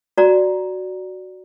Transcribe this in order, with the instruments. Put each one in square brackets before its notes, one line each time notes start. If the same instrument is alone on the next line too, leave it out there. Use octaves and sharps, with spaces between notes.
[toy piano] F#4 D5 A#5